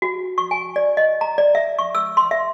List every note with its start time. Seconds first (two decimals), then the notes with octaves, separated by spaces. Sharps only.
0.02 F#4
0.38 C#6
0.51 G#5
0.76 D5
0.97 D#5
1.21 A#5
1.38 D5
1.55 E5
1.79 C#6
1.95 E6
2.17 C6
2.31 E5